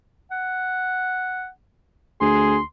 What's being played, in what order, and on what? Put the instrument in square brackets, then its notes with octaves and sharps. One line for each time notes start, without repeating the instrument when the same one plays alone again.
[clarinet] F#5
[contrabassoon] D2 [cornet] G#4 [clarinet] C6